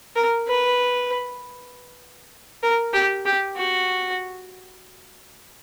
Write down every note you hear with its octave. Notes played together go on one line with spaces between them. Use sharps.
A#4
B4
A#4
G4
G4
F#4